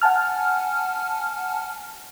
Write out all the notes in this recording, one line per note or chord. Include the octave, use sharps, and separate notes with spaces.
F#5 G#5 A5 F6